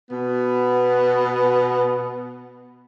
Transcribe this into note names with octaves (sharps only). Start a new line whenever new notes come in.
B2 B3